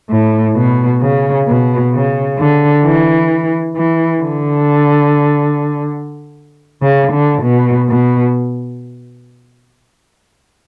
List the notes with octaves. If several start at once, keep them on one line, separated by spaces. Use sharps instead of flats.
A2
B2
C#3
B2
C#3
D3
E3
E3
D3
C#3
D3
B2
B2